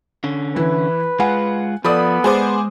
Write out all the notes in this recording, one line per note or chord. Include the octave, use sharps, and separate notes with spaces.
D3 C#4
E3 E4 B4
G#3 F4 F#5 G#5
F3 B3 A4 D5 B5 D#6
G#3 G#4 C5 D6